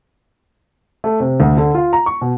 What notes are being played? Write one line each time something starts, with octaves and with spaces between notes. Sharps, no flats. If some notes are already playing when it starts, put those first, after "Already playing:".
A3
C3
D2
D3
F4
A#5
C#6
B2